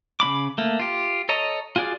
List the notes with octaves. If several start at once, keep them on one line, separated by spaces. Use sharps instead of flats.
C#3 C#4 B5 D6
A3 A#3
F4 G4
A4 C#5 D#5 A#5
F4 F#4 G#4 D5